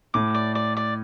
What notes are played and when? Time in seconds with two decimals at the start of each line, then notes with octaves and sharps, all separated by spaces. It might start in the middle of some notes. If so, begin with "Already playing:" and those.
0.14 A2 D6
0.34 D5
0.55 D5
0.77 D5